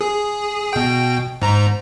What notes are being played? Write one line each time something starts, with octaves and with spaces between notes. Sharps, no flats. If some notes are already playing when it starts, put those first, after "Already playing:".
G#4
B2 G5
G#2 A#5